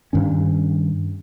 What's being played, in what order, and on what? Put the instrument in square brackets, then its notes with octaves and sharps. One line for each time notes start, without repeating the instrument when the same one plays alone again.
[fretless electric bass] G2 D#3 C#4